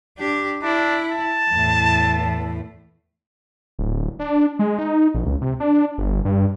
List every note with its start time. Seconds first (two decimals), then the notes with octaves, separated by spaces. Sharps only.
0.18 D4 G4
0.63 D4 E4
1.12 A5
1.51 E2 A2
3.79 D1
4.19 D4
4.59 G#3
4.79 D#4
5.14 A#1
5.26 C#2
5.41 C3
5.60 D4
5.98 G1
6.25 G2